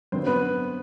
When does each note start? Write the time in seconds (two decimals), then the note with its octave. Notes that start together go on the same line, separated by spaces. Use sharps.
0.12 F#2 D3 F#3 B3 C4 C5
0.27 B3 B4